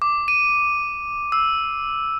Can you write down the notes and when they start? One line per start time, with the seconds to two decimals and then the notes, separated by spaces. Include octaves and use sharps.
0.02 D6
0.28 D#7
1.32 E6